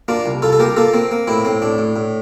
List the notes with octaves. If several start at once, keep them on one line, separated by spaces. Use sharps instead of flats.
A#3 D4 F4
C2
C2 F4 A4
A4
A#3 G4 A#4
A#3 F4 A4
A#3 C4
A#3
A2 C4 E4
A2 C4
A2 D4
A2
A2